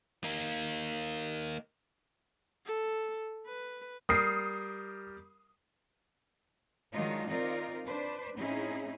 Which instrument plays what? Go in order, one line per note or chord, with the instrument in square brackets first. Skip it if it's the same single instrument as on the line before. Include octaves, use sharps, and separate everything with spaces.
[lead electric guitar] A#3 D#4
[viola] A4
B4
[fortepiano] G3 G4 A#4 [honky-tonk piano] D#6 C7
[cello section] D#3 F#3 G#3 D4 D#4 F4
C4 D#4 F4 A#4 D5
D4 B4 C5
A2 C4 C#4 D#4 E4 G#4